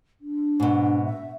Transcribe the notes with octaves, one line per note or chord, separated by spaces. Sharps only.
D4
G#2 B2
E5